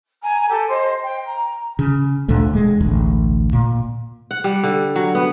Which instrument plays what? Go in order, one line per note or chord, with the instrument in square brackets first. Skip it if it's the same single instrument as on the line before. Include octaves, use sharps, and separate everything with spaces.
[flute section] G#5 A#5
G4 A4
C5 D#5 C6
G5
A#5
[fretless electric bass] C#3
D2 A#2 D3 A3
E1 G#3
E1 A1 D2
A#2
[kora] F#5
G3
D3
F#3
B3